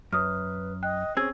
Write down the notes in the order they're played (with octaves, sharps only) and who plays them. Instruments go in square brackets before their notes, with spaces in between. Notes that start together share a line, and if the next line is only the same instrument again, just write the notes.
[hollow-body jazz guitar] F#2 [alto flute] B4 [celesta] D#6 F6
[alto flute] D#5 [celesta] G5 F#6
[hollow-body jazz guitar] C4 G#4 [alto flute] C#4 [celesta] E6 G#6